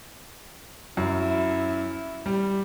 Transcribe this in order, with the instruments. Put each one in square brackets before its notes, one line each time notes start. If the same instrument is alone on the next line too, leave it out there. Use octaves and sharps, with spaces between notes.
[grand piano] F#2 [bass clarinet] E4
[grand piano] G3